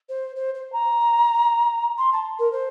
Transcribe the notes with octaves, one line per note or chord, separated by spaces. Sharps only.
C5
C5
C5
A#5
C6
A5
A#4
C5